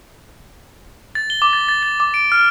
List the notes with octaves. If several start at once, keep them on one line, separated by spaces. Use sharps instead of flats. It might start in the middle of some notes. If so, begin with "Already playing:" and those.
A6
G7
D6
A6
A6
A6
D6
D7
F6